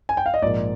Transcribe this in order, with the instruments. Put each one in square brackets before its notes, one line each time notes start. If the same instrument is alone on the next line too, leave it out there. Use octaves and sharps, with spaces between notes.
[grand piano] G#5
G5
F5
D#5
A#1 G#2 F3 A#3 D5